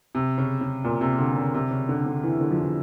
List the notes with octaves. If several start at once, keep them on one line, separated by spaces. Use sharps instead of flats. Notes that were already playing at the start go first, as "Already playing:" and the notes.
C3
C#3
C#3
A#2
C3
D3
C#3
C3
C#3
D3
D3
E3
D3
F3
E3